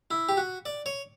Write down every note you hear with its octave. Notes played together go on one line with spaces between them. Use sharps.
E4
G4
F#4
D5
C#5